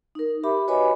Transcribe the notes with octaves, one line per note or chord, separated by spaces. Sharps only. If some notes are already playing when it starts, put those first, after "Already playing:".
D#4 A#4
G4 E5 B5 D6
F#4 B4 C#5 D#5 G#5 B5